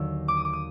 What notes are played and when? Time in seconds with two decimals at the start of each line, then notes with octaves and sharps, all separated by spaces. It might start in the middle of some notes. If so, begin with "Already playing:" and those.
Already playing: D#2 D3 F#3 E6
0.28 D6
0.37 D#6
0.45 D6
0.53 D#6